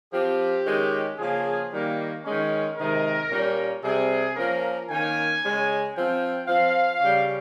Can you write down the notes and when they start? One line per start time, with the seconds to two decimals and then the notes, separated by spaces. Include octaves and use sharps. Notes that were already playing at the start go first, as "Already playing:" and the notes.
0.13 F3 C4 G4
0.66 D#3 G#3 C#4
1.18 C#3 F3 A#3 C#4 G#4
1.71 D#3 G3 A#3
2.24 D#3 G#3 C#4
2.78 C3 D#3 G#3 A#4
3.30 A#2 G3 A#3 C#4
3.83 C3 G3 C4 G#4
4.36 F3 A#3 C#4 A#4
4.89 D#3 A#3 C#4 G#5
5.42 C#3 G#3 C#4
5.95 F3 C4 G5
6.47 F3 C4 F5
7.00 C#3 G3 C#4